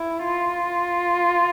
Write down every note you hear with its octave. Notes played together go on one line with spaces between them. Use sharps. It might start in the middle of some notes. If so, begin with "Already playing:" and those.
Already playing: E4
F4